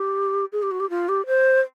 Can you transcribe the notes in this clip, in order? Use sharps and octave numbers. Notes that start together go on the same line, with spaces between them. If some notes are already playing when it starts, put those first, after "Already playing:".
Already playing: G4
G#4
G4
F#4
G4
F4
G4
C5